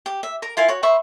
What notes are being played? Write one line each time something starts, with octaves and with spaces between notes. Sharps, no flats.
G4
E5
A#4 A#5
E4 F4 A#4 G#5
F#4 C#5
C5 E5 B5 C#6